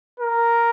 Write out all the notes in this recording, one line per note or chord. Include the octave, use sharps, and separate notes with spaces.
A#4